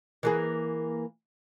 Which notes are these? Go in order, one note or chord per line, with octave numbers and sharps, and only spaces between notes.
E3 A#3 G#4